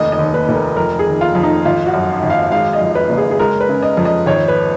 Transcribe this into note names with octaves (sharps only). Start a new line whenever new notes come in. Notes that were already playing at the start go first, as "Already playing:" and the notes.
Already playing: F1 D#2 D#5
D#5
D#2
B4
F1
A#4
F2 A#4
G#4
D#3
F4
F2
D#4
G#1 F4
F#4
F#2
G#1
F5
G#3 F5
D#5
F2
B4
F#1
G#4
G#4
G#3 A#4
B4
C#3
D#5
F2
D#5
G#1 C#5
B4